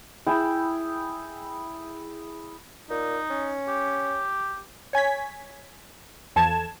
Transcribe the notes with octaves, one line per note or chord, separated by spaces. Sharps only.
E4 G#4 G5 B5
A#2 D#4
C#4
G4
C#5 G#5 G#6 B6
E2 F3 A4 A5 G#6 E7